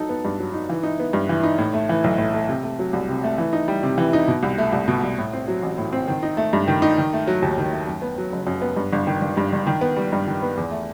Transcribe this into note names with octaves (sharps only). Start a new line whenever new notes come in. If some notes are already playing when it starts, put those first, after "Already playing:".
Already playing: F#3 D#4 A4
B3
G2
F#3
D#4
E3
D#4
B3
G2
E3
D#4
A2
A3
E3
B1
A2
A3
C3
A3
F#3
C2
C3
A3
E3
D#4
G3
C3
E3
D#4
B2
C2
A3
C2
B2
C2
A2
C4
F#3
A1
A2
C4
D#3
D#4
A3
G2
D#3
D#4
D#3
A3
F#3
D#2
D#3
A3
F#2
B3
F#3
F#1
F#2
B3
G2
G1
D#3
G1
G2
G1
D#3
B3
G3
G2
D#3
B3
E2
A3